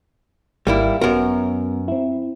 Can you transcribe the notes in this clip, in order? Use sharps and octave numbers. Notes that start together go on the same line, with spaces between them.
G#1 G3 A#3 E4
F#2 B3 F#4 A#4
C4 E4